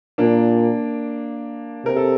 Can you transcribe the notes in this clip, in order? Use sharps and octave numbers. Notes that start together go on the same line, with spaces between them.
A#2 A#3 D4
C3 A#4
A4